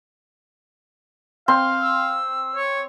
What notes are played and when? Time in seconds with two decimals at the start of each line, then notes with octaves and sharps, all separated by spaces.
1.48 C4 F5 C6
1.81 E6
2.56 C#5